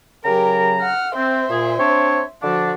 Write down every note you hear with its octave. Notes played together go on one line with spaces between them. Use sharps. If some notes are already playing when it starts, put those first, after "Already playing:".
C#3 F#3 G4 A#4 A#5
F#5 F6
C4 C5 E5
A#2 G#4
C4 D4 C#5
D3 F3 D4 F#4